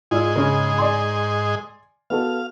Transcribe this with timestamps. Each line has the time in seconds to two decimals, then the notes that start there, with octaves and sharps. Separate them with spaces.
0.11 G#2 F4 G#4 D5 D#5 E6
0.36 C#3 C#4
0.78 D5 G#5 C6
2.10 B3 F#4 A4 F5